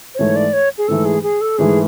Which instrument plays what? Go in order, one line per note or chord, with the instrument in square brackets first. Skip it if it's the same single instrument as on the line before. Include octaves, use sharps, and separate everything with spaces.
[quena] C5
[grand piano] G#2 E3 A3 [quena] C#5
[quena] D5
C#5
G#4
[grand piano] G#2 E3 A3 [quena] A4
[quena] G#4
G#4
A4
[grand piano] G#2 E3 A3 [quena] G#4